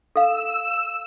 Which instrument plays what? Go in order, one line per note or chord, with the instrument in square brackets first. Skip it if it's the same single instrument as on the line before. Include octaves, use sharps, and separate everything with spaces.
[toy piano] A4 F5 [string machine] E6